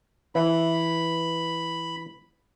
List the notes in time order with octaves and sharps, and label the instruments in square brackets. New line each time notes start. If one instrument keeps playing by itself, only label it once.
[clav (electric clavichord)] E3 [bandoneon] B5